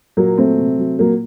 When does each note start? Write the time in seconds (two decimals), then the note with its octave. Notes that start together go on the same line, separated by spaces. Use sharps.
0.17 A#2 F#3 A#3
0.38 F#3 A3 C4
0.59 C3
0.78 F#3
0.99 A#2 F#3 A#3